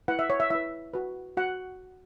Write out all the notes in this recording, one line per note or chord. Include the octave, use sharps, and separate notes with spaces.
E4 B4 F#5
E5
C#5
E5
E4 B4 E5
F#4 B4
F#4 F#5